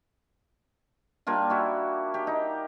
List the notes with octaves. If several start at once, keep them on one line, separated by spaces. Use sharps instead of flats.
G3 A#3 D4 F4
E4 F#4
G4
D#4